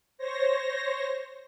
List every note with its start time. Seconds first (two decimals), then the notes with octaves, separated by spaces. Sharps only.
0.18 C5 C#5 A#6